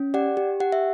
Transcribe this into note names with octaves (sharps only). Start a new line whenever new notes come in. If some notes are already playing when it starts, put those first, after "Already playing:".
Already playing: C#4
G4 D5 F#5
G4
G4 F#5
E5